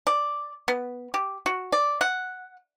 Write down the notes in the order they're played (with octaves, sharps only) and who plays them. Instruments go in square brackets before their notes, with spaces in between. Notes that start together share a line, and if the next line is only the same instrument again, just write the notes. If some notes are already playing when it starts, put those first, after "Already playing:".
[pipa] D5
B3
G4
F#4
D5
F#5